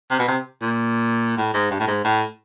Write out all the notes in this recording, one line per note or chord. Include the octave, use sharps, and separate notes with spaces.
C3
B2
C3
A#2
A2
G#2
G2
A2
G#2
A2